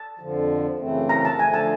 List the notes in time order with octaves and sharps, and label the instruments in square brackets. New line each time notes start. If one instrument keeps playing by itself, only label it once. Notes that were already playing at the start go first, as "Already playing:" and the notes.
Already playing: [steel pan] A5
[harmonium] F2 D3 F3
F#2 C#3 E3 A3 C4
[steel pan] A#5
A5
[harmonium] D3 F3 A3 [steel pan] G#5
[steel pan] A5